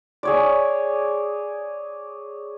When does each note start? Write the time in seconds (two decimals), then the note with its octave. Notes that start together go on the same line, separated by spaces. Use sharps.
0.23 G#4 C#5 D5